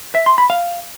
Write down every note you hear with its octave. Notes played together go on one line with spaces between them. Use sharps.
E5
C6
B5
F5